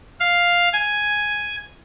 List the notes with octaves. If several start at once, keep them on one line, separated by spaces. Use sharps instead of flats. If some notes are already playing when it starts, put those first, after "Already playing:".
F5
G#5